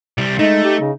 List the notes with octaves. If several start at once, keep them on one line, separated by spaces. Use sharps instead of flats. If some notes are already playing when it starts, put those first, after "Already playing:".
C2 G3
G#3 A3 D#4
G4
C#3